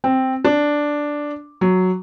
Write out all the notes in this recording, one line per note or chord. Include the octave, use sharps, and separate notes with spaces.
C4
D4
F#3